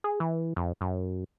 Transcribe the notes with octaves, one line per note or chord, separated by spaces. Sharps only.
G#4
E3
F2
F#2